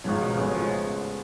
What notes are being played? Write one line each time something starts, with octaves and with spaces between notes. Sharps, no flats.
G#1 G#2 C#3 F3 B3
B2
A1 A2 C#3 G#3 B3
F3